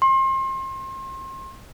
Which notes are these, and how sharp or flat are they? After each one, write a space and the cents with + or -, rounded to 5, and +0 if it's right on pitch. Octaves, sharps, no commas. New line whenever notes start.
C6 +35